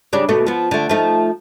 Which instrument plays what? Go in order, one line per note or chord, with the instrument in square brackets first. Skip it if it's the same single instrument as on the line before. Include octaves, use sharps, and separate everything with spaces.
[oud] C#3 G3 D4
D#2 B2 A3
F3 B3
D3 A3
F3 A3 D#4